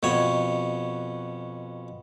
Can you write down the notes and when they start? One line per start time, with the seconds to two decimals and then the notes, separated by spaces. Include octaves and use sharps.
0.03 F2 B2 C#5